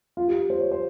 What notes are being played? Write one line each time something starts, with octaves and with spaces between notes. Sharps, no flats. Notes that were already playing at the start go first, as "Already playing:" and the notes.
F4
G4
C5
C#5
C5